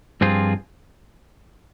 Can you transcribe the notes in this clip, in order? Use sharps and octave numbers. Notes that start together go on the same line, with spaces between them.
G2 F3 C4 F4 G#4